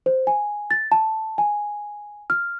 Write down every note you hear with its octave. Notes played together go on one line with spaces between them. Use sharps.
C5
G#5
A6
A5
G#5
F6